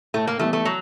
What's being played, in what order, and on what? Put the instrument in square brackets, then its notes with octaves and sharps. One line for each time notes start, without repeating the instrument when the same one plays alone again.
[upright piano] A2 [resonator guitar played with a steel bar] A3
[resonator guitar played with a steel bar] A#3
[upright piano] E3 G3 B3 [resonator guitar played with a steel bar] A3
[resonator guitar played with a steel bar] A3
F#3